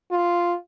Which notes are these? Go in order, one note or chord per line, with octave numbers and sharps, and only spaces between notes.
F4